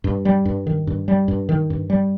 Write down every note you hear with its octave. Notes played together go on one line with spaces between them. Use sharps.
G2
G3
G2
D#3
G2
G3
G2
D#3
G2
G3